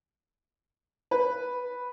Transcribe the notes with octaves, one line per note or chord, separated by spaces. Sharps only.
B4